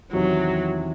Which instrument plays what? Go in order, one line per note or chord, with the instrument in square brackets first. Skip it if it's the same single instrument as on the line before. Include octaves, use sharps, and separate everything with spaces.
[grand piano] E2 C3 D#3 [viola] F#3